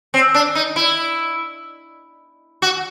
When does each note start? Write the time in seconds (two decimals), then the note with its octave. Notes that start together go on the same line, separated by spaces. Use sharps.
0.14 C4
0.34 D4
0.55 D#4
0.76 E4
2.62 F#4